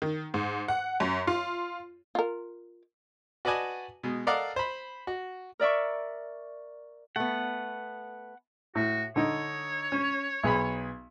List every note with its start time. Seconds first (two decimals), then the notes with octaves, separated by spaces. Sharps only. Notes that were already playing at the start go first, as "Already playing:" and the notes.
0.02 D#3
0.34 G#2
0.68 F#5
1.00 F#2
1.27 F4
2.15 F4 A#4
3.45 F#4 B4 D5 D#5 G#5 A5
4.03 B2 G#3
4.27 A4 A#4 D5 D#5 F5 F#5
4.56 C5 B5
5.07 F#4
5.59 A#4 D5 E5 C#6
7.16 A3 B3 F#5
8.75 A2 F#4
9.16 D3 D#4 C#5
9.92 C#4
10.43 B1 G#4 B5